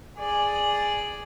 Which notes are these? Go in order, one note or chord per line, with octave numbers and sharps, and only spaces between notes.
G#4 D5